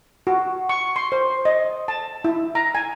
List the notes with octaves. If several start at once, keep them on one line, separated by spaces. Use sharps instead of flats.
F#4
C#6
C6
C5
D#5
A5
E4
A#5
G#5